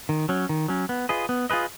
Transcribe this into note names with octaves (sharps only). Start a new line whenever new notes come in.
D#3
F#3 C#4
D#3
F#3 C#4
B3
F4 G#4 B4 D#5
B3
F4 G#4 B4 D#5